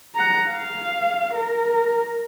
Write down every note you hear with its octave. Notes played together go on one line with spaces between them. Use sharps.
F#5 A#5
F5
A#4